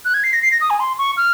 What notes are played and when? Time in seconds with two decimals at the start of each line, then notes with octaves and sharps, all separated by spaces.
0.05 F#6
0.14 G#6
0.24 C7
0.33 A#6
0.42 C7
0.51 A#6
0.61 D#6
0.70 G#5
0.80 C6
0.98 C#6
1.17 F6